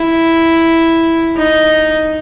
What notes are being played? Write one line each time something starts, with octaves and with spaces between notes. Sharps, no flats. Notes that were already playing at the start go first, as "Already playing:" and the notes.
Already playing: E4
D#4